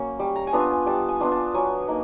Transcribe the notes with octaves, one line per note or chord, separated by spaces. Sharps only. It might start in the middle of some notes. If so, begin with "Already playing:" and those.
Already playing: F#3 A#3 C#4
G3
A#5
G#5
B3 D4 F4 A5
G#5
G3 A5
G#5
B3 D4 F4
A5
F#3 G#5
A#3 D#4